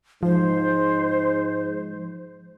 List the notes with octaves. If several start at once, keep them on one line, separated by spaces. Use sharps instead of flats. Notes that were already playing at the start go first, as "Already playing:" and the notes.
G#2 F3 C5